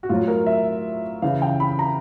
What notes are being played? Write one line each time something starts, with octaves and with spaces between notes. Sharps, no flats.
F#4
A2 F#3 F4
A#4
E5
C#3 E3 F5
G5
B5
A#5